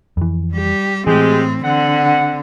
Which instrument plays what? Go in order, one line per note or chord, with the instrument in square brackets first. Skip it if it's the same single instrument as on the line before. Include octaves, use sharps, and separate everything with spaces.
[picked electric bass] F2 E3
[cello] G3 G4
[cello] A2 C4 [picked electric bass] E3 [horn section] G#3 G4
[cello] D3 C4 [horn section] F#5